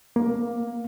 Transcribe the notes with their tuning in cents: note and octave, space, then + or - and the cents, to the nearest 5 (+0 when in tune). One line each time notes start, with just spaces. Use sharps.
A#3 +15